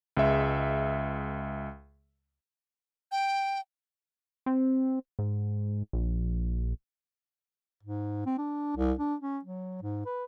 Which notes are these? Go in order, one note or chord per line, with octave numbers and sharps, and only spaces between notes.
C#2 G#3 E5
G5
C4
G#2
A#1
G#2
C4
D4
C2
D4
C#4
F#3
G#2
B4